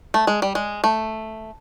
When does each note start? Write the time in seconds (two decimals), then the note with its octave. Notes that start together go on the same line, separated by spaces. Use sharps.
0.14 A3
0.27 G#3
0.42 G3
0.55 G#3
0.84 A3